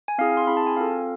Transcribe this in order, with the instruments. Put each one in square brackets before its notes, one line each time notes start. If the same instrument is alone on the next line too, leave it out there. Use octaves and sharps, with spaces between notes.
[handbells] G#5
C4 E4 G#4 F5
C6
C4 E4 G#4 B5
A5
G#5
C4 F4 A4 F5